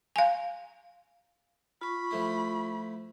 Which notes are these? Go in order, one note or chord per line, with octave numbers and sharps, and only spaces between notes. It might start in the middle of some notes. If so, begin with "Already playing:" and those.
F5 G#5
F4 B5 C#6
F3 A3 E4